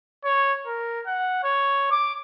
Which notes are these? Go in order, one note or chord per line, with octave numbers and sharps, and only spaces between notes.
C#5
A#4
F#5
C#5
D6